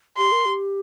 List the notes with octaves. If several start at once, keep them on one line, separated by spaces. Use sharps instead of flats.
G4 C6
A#4
G4